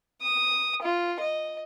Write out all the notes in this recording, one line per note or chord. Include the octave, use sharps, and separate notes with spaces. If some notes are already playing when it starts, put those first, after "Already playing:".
D#6
F4
D#5